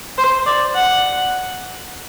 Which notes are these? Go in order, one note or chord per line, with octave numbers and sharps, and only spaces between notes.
C5
D5
F#5